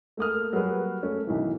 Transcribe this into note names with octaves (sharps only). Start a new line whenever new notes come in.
A3 A#3 D#6 F6
F#3 G3 A#3 G#4 B4
A3 C#4
B1 D#3 E3